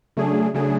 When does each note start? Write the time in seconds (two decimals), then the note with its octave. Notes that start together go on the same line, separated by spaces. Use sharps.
0.17 C#3 F#3 A3 D4 G#4
0.54 C#3 F#3 A3 D4 G#4